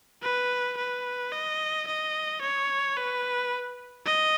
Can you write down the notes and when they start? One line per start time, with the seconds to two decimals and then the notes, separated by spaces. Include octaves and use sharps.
0.23 B4
0.77 B4
1.33 D#5
1.87 D#5
2.42 C#5
2.97 B4
4.06 D#5